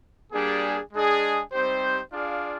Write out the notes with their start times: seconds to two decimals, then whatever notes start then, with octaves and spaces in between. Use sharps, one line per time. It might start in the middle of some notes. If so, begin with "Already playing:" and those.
0.32 G3 A#3 D4 G#4
0.93 G#3 D4 G#4 D#5
1.53 G3 C4 D#4 G4 C5
2.13 D4 F4 G#4 D5 F5